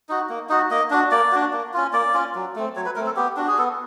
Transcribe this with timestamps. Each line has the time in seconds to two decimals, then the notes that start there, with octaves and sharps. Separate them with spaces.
0.09 D#4 F#4
0.29 A#3
0.49 D#4 F#4
0.71 A#3 D#5
0.90 D4 F#4
1.11 A#3 D5
1.32 D4 F#4
1.53 A#3
1.74 C#4 F4
1.93 A#3 D5
2.14 C#4 F4
2.35 F#3
2.56 A3 C4
2.76 F#3 C#5
2.86 B4
2.96 A3 C4 A#4
3.06 A4
3.16 B3 G4
3.37 D4 F#4
3.48 G#4
3.58 B3 A4